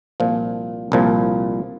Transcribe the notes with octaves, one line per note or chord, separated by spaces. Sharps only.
C2 A#2 F3
C2 A#2 F3